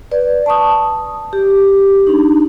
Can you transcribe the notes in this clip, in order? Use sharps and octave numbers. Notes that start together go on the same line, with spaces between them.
B4 D5
A5 C#6 D#6
D#6
G4
D4 D#4